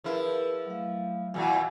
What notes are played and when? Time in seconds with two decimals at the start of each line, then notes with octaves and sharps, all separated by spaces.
0.04 F3 E4 G#4 A#4 B4
0.66 F#3 A3 F5
1.34 E2 A#2 E3 F#4